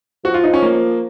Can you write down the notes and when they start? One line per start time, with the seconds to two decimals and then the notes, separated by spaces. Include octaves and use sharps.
0.24 F3 F#4
0.34 F4
0.44 D#4
0.54 C#4
0.62 A#3